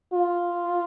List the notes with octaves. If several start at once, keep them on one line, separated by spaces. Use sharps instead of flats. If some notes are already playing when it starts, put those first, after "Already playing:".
F4